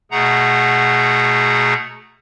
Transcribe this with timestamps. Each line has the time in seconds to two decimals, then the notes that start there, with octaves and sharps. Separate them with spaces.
0.11 B2 A3 G#4 F#5 A#5